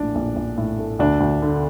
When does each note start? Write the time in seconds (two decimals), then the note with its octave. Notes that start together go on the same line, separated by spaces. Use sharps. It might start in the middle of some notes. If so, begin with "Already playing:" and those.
Already playing: A#1 A2 D4
0.15 A#1
0.36 A#1
0.58 A2
0.79 A3
0.99 D2 D4
1.20 D2
1.42 D3